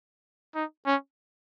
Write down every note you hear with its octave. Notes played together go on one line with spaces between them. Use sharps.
D#4
C#4